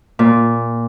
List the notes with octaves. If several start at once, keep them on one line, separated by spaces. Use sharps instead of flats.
A#2